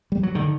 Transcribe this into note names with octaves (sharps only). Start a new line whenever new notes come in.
G3
F#3
D3 D#3